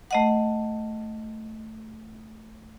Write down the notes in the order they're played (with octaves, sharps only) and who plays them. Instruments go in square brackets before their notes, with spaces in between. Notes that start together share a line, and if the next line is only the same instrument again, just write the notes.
[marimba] A3 D#5 F#5